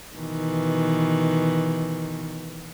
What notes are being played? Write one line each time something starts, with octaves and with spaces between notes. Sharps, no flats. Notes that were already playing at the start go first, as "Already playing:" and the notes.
B2 D#3 E3